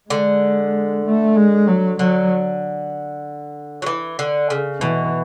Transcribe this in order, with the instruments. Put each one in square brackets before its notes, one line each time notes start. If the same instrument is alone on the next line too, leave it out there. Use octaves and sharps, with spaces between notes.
[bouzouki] D3 [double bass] G#3
[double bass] A3
G#3
F#3
[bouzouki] D3 [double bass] F#3
[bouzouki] F#3
E3
D3
C#3
[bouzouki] B2 [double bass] E3